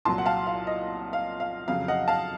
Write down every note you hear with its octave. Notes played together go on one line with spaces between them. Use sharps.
C2 A#2 F#3 A5 C6
F#5
F5 A5
F5
D#5
F5
F5
F2 C#3 F#3 F5
D#5 F#5
F5 A5